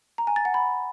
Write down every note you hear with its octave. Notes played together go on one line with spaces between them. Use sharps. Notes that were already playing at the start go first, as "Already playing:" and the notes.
A#5
G#5
A6
F#5
B5